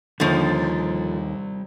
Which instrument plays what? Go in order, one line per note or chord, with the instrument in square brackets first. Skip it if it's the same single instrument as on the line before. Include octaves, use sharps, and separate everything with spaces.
[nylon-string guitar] D#2 [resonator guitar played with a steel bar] D3 F3 [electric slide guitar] G3 C5